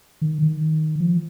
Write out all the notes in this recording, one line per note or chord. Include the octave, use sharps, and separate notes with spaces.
D#3
D#3
F3